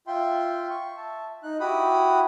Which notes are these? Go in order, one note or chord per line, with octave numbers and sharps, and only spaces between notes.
F4 E5 G5 C6
C#6
E5 A5
D#4 F#6
E4 F#4 G4 B5 D#6